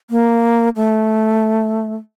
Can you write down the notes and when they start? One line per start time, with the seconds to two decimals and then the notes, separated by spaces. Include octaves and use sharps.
0.10 A#3
0.76 A3